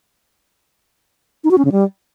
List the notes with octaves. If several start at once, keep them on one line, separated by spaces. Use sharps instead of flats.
D#4
F#4
C#4
C#3
G3